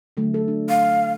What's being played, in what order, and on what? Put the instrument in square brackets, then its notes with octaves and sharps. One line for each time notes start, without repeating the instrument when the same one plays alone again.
[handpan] D3 F#3 A3
A4
D4
[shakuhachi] F5